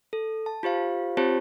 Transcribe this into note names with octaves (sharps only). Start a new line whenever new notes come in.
A4
A5
F4 G4 C5 F5
C4 F4 G4 C5 C#5 A5